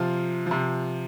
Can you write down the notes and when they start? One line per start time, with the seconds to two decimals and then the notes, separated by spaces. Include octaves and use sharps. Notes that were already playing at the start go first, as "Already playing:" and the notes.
Already playing: C3 F3 F4
0.46 C3 F3